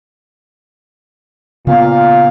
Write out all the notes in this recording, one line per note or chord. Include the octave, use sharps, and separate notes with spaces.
A#2 C#3 B3 F5